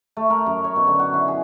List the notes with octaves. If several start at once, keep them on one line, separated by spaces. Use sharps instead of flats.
A3
A#4
F#2
C#5
B2
D3
F#4
E4
G#4